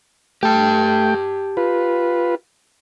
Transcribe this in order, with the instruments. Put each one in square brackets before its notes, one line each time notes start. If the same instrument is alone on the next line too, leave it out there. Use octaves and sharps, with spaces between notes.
[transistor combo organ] A3 G5 [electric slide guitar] G4 A5
[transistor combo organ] F4 B4